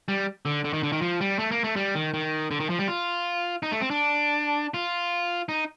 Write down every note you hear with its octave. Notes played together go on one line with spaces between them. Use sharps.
G3
D3
D3
D#3
D3
D#3
F3
G3
A3
A#3
A3
G3
D#3
D#3
D3
D#3
F3
G3
F4
D#4
A3
C4
D4
F4
D#4